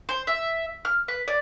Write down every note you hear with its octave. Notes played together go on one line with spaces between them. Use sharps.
C5
E5
F6
B4
D5